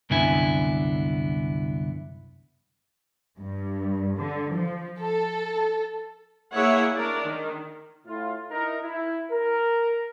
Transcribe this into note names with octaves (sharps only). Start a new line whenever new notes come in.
C2 F#2 D3 B3 E4 G#5
G2
D3
F3
A4
A#3 E4 G#4 C#5 E5 F#5
D4 A#4 D5
D#3
A2 E4 F4
D#4 E4 A#4
E4
A#4